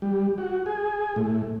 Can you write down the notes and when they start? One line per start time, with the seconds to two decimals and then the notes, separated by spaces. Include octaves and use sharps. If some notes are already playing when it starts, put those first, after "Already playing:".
0.02 G3
0.38 F#4
0.66 G#4
1.16 A2